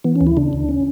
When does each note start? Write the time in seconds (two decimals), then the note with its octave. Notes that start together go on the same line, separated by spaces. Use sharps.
0.04 E3 B3
0.16 C#4
0.21 D2
0.27 E4
0.37 C#3 D4
0.53 D2
0.69 C#4